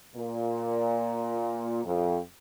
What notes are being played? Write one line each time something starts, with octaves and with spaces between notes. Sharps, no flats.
A#2
F2